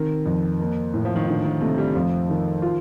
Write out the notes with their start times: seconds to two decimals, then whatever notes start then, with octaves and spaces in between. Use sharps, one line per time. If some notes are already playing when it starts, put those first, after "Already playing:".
Already playing: C3 D#3
0.26 F2
0.60 A#3
0.94 A2
1.05 F3
1.16 D#3
1.28 A2 D3
1.45 D#3
1.61 C3 A3
1.78 G3
1.95 F2 F3
2.29 D#3
2.62 F4